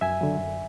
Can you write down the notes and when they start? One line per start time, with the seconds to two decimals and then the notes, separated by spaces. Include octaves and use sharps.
0.01 F#2 E5 G#5
0.21 D3 F#3
0.39 F#2